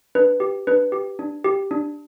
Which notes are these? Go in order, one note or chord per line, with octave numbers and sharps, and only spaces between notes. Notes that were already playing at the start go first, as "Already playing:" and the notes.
D4 B4
G4
D4 B4
G4
D4
G4
D4